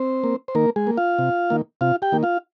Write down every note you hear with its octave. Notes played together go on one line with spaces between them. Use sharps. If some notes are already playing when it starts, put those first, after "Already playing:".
Already playing: C4 C5
A#3
C5
D#3 A#3 A#4
G#3 G#4
A#3
F4 F5
C3
D#3 A#3
C3 F4 F5
G4 G5
D#3 A#3
F4 F5